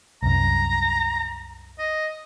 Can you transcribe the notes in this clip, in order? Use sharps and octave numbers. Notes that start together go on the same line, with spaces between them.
C2 F#2 A#5
D#5